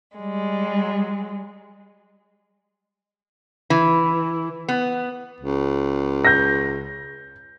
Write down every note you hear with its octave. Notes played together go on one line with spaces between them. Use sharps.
G3 G#3
E3
B3
C#2
G6 A#6